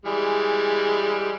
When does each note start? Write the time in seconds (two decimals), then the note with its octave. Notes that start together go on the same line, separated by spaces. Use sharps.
0.06 E3 G3 G#3